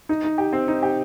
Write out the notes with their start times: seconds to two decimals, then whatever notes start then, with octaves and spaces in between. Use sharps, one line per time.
0.09 D#4
0.24 D#4
0.38 G4
0.53 C4
0.68 D#4
0.83 G4